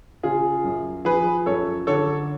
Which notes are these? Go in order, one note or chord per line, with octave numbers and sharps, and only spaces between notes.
C#3 F4 G#4
F#2
F3 G#4 B4
F#2 A4 C#5
D3 A4 C#5